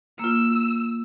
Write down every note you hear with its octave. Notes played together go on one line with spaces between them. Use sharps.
A#3 F4 E6